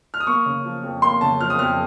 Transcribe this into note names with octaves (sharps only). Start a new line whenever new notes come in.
F6
D#6
A#3 C#6
C#3
F3
F2
A#3 C6
C#3 A5
F3 F6
D#6
F2 F6